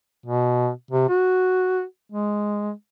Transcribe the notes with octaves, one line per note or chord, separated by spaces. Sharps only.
B2
C3
F#4
G#3